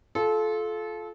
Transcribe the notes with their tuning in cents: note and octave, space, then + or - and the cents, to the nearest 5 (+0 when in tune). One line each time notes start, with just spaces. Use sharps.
F4 +0 A4 -25